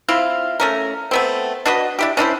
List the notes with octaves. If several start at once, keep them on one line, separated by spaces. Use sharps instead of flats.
C4 E4 F4
A3 C#4 A#4
A3 B3 C4
D4 F#4 B4 D#5
D4 E4 G4
C#4 D4 E4 C5